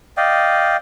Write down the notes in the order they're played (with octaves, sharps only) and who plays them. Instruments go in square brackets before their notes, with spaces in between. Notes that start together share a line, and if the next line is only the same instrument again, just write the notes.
[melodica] D5 D#5 F5 G5